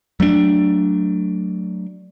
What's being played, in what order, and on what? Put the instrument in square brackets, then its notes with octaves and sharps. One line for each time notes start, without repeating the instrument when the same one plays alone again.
[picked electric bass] F#3 A3 B3 D4